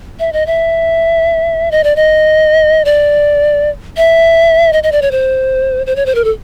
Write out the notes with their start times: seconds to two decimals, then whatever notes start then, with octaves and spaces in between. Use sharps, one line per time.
0.20 E5
0.33 D#5
0.47 E5
1.71 D#5
1.84 D5
1.96 D#5
2.85 D5
3.97 E5
4.73 D#5
4.83 D#5
4.92 D5
5.02 C#5
5.11 C5
5.86 C5
5.96 C#5
6.06 C5
6.15 A#4
6.24 A4